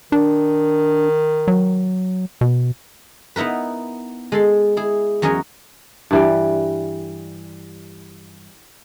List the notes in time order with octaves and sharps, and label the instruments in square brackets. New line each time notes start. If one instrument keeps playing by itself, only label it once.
[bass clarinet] D#3 [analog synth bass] D4
[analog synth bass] F#3
B2
[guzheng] B3 D#4 E4 A#4 B4
G#3 A4 C6
E4 G#4
E2 F#3 C#4 A#4 D#5 G#5
[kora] G2 E3 G3